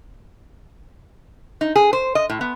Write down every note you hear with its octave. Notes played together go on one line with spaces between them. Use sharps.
D#4
G#4
C5
D#5
A2
B3